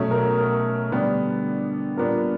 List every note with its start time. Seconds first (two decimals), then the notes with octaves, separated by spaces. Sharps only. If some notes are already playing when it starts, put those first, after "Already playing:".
Already playing: B2 F#3 A3 C#4
0.11 A#4
0.38 A#4
0.92 D3 G3 B3 D4
1.97 A#2 G3 B3 D4 A#4